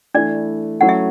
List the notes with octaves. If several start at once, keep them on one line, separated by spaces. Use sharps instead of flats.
E3 A3 D4 E4 D5
F#3 A3 C#4 E4 F#5
E5